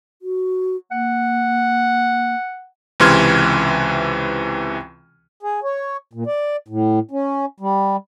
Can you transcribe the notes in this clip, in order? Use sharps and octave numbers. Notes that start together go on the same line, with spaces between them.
F#4
A#3 F#5
C#2 C3 E3 C6 F6 G#6
G#4
C#5
A#2
D5
A2
C#4
G3